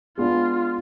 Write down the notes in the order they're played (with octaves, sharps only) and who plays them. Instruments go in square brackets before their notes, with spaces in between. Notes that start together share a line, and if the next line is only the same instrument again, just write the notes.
[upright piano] G#3 B3 D4 [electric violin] F4